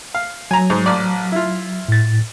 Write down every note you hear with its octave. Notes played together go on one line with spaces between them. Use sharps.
F5
F#3 G#5 A#5
G#2
A1 D5
E4 F4
A2 A6